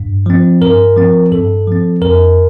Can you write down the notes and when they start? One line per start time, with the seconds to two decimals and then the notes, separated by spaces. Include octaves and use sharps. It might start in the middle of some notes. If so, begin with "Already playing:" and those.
Already playing: G2
0.26 F3 C4
0.62 G2 A#4
0.97 F3 C4
1.32 G2 A4
1.68 F3 C4
2.01 F2 A#4